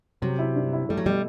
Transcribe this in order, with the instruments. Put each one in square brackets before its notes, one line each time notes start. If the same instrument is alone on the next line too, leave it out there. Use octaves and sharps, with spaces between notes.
[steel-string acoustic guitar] C3 [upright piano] F#3
[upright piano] E4
G2
E4
[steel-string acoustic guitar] G3 [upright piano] A3
[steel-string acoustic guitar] F#3
[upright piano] B2 [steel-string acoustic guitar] G3